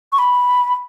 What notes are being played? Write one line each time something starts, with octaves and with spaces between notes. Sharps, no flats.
C#6
B5